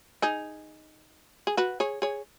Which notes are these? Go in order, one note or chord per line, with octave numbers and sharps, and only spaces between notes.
D#4 G#4
G#4
F#4 B4
G#4 C#5
G#4 C#5